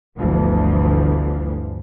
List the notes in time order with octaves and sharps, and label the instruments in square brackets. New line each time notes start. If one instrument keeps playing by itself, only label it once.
[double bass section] G1 D2 E3 F3